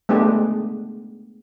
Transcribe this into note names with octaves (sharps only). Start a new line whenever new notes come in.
G#3 A3 B3 D4 G4